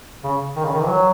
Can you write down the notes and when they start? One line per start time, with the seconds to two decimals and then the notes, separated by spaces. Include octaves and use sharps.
0.23 C#3
0.56 D#3
0.64 C#3
0.73 D#3
0.81 E3
0.89 F#3